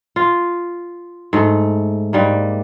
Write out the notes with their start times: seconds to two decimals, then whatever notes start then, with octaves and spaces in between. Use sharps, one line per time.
0.16 F4
1.33 G#2 A3
2.13 G#2 G3 A#3